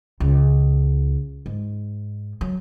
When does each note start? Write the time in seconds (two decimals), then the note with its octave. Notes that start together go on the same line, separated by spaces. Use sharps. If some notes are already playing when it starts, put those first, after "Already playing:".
0.20 C#2
1.46 G#2
2.41 F#3